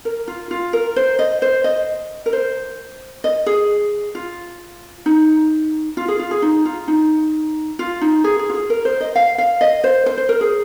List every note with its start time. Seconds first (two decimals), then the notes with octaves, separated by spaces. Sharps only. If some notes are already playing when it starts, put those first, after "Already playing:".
0.05 A#4
0.28 F4
0.51 F4
0.73 A#4
0.96 C5
1.19 D#5
1.42 C5
1.64 D#5
2.26 A#4
2.33 C5
3.24 D#5
3.46 G#4
4.15 F4
5.06 D#4
5.97 F4
6.08 G#4
6.19 F4
6.31 G#4
6.42 D#4
6.65 F4
6.88 D#4
7.79 F4
8.01 D#4
8.24 G#4
8.39 G#4
8.49 F4
8.55 G#4
8.70 A#4
8.85 C5
9.01 D#5
9.16 F5
9.38 F5
9.61 D#5
9.84 C5
10.06 C5
10.18 C5
10.29 A#4
10.41 G#4